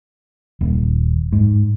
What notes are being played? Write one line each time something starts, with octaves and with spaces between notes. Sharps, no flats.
D#1
G#2